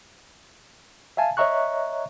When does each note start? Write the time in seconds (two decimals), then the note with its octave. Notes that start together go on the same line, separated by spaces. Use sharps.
1.17 E5 F5 G#5 A5
1.37 C#5 D#5 E5 A#5 C#6 F#6